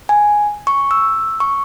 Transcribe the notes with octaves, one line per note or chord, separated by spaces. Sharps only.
G#5
C#6
E6
C#6